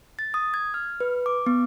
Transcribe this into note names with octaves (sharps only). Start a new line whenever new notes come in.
A6
D#6
G#6
F6
B4
D6
B3